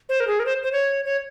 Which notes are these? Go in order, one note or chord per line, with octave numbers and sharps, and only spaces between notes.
C5
A#4
G#4
A#4
C5
C5
C#5
C#5